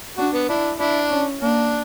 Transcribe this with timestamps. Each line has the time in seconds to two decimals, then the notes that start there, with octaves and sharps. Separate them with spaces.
0.18 D4 F#4
0.34 B3
0.49 D4 E4
0.80 D4 E4
1.10 C#4
1.41 A#3 D4